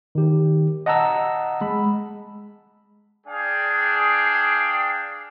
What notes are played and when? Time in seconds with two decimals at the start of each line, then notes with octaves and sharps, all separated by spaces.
0.15 D#3 G4
0.86 D#5 F#5 A5 A#5 E6
1.61 G#3 B5
3.27 D4 G#4 F5 G5